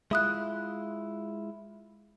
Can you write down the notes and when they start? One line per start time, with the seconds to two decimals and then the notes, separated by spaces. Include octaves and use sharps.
0.11 G#3 E4 F4 E5 D#6 F#6